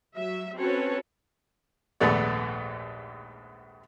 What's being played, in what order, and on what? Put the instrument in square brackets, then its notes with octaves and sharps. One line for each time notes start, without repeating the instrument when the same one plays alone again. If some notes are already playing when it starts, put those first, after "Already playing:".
[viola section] F#3 E5
C4 C#4 F#4 A4 B4 C#5
[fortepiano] A#1 D#2 G#2 A3 B3 D5